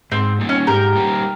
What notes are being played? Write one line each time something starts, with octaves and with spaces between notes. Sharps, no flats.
G#2 C4
G3 A#3 D#4
C#4
G#2 G4 A#4
G3 A#3 D#4